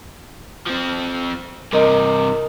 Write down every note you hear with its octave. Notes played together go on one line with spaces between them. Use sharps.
F3 C4
G2 C3 A#4 D#5